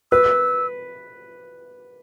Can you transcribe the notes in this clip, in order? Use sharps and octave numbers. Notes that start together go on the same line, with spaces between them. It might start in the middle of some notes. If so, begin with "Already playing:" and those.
B4 E6